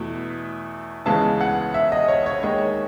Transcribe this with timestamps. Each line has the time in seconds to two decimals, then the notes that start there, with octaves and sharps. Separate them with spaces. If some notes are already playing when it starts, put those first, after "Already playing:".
Already playing: E2 B2 A3 E4
1.06 C#2 C#3 E3 G#3 B3 A5
1.41 F#5
1.74 E5
1.92 D#5
2.08 C#5
2.26 C#5
2.43 D#2 D#3 G#3 D#4 C#5